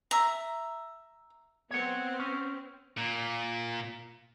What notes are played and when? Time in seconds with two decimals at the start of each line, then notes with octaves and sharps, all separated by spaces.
0.11 E5 A#5
1.71 B3 C4 C#5 F#5
2.20 C#4
2.98 A#2